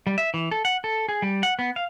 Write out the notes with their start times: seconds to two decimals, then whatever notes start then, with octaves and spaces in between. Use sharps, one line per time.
0.07 G3
0.18 E5
0.34 E3
0.51 A4
0.65 F#5
0.84 A4
1.09 G#4
1.22 G3
1.43 F#5
1.59 B3
1.76 F5